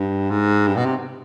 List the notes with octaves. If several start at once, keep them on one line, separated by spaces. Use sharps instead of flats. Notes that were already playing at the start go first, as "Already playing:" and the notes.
Already playing: G2
G#2
G2
B2
C3